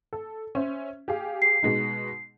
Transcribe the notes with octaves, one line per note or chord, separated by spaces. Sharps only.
A4
C#4 C5 E5
G4 G#4 F5
C7
B2 G#3 D#4